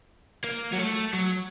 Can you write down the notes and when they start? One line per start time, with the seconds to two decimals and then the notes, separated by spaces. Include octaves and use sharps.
0.44 A#3
0.73 F#3
0.79 A3
1.14 F#3